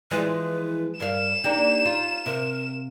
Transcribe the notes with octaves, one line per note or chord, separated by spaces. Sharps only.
E3 F3 G#3 B4
G2 A#4 F5 E7
A#3 D4 D#4 G4
F4
C3 A#4